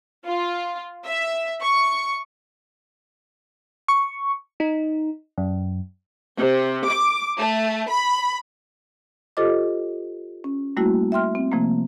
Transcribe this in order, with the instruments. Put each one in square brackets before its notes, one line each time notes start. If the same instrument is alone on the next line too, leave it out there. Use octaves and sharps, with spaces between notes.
[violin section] F4
E5
C#6
[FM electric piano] C#6
D#4
F#2
[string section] C3
D6
A3
B5
[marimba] F4 G4 A4 C5 D#5 D6
C#4
G3 A3 A#3 E4 F#4
E5 G5 C6 F6
C4
C3 F3 A3 A#3